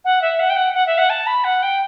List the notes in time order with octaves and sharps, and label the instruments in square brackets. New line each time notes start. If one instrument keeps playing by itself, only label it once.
[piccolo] F#5
E5
F#5
G5
F#5
F#5
E5
F#5
A5
B5
F#5
G5